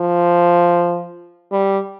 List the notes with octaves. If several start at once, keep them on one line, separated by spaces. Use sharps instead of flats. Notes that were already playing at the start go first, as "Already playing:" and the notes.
Already playing: F3
G3